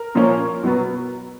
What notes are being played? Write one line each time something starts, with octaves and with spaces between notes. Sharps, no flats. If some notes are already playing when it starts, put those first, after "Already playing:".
Already playing: A#4
A#2 F3 A#3 C#4
B2 F#3 B3